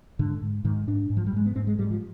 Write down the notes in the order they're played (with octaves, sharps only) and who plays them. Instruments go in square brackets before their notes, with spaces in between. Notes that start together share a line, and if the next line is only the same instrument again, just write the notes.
[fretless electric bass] G#2 D3
G#2
G#2 D#3
G#2 D4
G#2
F3
G3
G#2 G#3
B3
G#2 C4
G#3
G#2 G3
F3